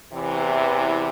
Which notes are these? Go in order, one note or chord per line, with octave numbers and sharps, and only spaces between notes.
E2 C3 E3